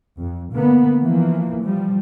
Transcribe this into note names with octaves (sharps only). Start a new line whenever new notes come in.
F2
D3 A#3 B3
E3 F3 A#3
F3 G3